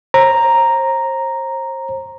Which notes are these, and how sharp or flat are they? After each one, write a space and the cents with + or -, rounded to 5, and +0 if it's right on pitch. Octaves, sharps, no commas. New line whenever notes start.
C5 +35 A#5 +0